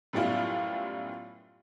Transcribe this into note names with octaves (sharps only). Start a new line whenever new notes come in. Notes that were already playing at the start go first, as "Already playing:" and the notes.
F#2 A2 G3 B3 E4 F4